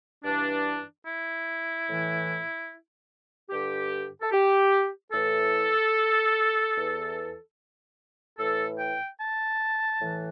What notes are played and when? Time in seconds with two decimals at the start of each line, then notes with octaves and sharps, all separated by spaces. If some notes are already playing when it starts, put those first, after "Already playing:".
0.24 G2 E3 D4
1.05 E4
1.87 A2 E3
3.49 G2 D3 G4
4.21 A4
4.31 G4
5.12 A2 E3 A4
6.75 E2 E3
8.38 A2 E3 A4
8.78 G5
9.19 A5
10.00 A2 E3